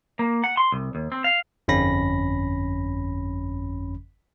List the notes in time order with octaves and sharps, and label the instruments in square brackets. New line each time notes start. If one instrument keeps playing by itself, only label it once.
[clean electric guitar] A#3
F#5
C6
C2
D#2
C4
F5
[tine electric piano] G1 F2 C#4 B5 A#6